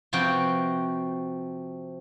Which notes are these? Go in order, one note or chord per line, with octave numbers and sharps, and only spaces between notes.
C3 F3 F#4 B4 G5